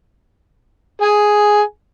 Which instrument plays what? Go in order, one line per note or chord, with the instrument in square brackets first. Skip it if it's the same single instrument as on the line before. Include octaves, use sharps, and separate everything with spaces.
[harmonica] G#4 G#5